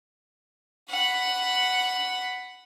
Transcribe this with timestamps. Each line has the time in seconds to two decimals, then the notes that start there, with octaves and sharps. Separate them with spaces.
0.90 F#5 B5